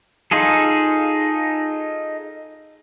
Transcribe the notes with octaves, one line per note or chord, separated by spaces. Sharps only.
D#4 F4 G#4 A4